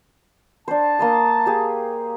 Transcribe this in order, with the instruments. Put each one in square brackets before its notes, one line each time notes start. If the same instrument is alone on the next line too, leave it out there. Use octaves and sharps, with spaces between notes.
[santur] D4 C5 [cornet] A5
[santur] A#3 C6 D#6
G4 G#4